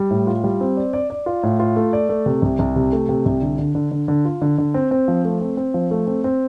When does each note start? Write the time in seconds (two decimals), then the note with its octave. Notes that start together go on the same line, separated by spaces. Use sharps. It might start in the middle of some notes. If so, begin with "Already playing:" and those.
Already playing: G3
0.10 A2
0.27 F4
0.44 G3
0.61 C4
0.77 D5
0.93 D5
1.10 D5
1.26 F4
1.43 A2
1.59 F4
1.76 A3
1.93 D5
2.09 A3
2.26 C3
2.42 C2
2.59 C2
2.76 C3
2.93 A3
3.09 C3
3.26 C2
3.42 D3
3.59 D3
3.75 D3
3.91 D3
4.08 D3
4.25 F4
4.42 D3
4.58 D3
4.74 C4
4.91 C4
5.08 F3
5.25 A3
5.41 C4
5.57 C4
5.74 F3
5.91 A3
6.07 C4
6.24 C4